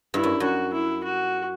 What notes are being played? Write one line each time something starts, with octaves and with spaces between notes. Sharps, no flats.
G2 E4
F#2
F#2 F#4
E4
F#4